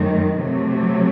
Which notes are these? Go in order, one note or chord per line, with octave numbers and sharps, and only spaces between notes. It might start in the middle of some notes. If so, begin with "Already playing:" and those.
Already playing: F#2 D#3 A3
C3 F#3 A3